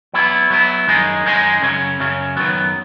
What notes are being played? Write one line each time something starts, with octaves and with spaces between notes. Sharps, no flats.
F#3 B3 E4
F#3 B3 E4
F#2 D#3 G#3 D#4 G#4
F#2 D#3 G#3 D#4 G#4
F#2 C#3 F#3 C#4
F#2 C#3 F#3 C#4
F#2 D#3 F#3 B3